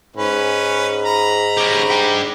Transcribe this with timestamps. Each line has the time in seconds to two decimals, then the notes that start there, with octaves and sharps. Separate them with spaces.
0.16 G#2 C#4 B4
1.05 A#5 B5
1.58 C#4 G4
1.91 D4 G5